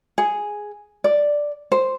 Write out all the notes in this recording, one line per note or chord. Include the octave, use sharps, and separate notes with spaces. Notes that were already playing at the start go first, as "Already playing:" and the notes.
G#4
D5
C5